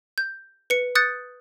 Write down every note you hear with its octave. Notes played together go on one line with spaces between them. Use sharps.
G6
B4 C#7
D#6 F#6 G6 A6 C#7